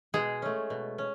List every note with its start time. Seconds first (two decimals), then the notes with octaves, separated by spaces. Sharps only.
0.14 B2 G#3 G#4
0.42 A3 C#4
0.70 B2
0.98 C#4